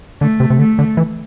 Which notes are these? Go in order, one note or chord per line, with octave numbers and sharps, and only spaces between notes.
D3 A3
C3
C3
D3 A3
D3
E3